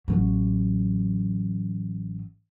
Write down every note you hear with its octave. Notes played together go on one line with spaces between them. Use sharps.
A1 F#3